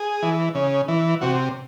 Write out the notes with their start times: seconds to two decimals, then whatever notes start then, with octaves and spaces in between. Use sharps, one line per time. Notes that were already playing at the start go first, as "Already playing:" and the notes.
Already playing: G#4
0.23 E3
0.55 C#3
0.88 E3
1.21 C3 F#4